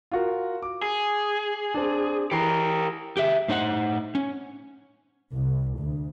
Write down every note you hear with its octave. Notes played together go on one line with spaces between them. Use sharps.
F4 F#4 A#4
D6
G#4
C4 D4
E3 G4 A#4 C7
G4 G#4 E5
A2 D#4 C5 F#5
C#4
C2
D2